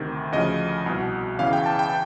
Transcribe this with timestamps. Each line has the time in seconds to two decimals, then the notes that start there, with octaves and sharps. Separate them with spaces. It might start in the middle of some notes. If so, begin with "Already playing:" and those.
Already playing: D2 C3 D#3
0.32 D2 C#3 F3 D#5
0.86 C2 B2
1.39 E2 C#3 E3 F5
1.53 G5
1.66 A5
1.79 G5